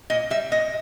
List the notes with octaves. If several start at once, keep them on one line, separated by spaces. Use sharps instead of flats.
A#2 D#5
G3 E5
A#2 D#5